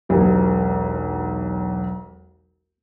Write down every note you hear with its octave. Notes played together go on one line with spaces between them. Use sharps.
E1 B1 G4